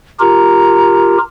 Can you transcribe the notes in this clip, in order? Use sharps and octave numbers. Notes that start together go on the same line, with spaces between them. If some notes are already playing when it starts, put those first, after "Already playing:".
F4 G4 A#4 A#5